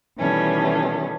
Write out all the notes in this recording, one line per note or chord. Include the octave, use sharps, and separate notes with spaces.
B2 D#3 E3 G3 A3 C#4